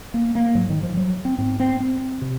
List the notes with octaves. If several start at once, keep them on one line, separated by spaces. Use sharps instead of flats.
A#3
A#3
G#2 F#3
D#3
F3
F#3
C4
G#2 C4
C4
C4
C3